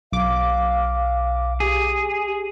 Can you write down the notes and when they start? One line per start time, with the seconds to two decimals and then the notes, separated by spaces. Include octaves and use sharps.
0.12 B1 F5 D6
1.60 G4 G#4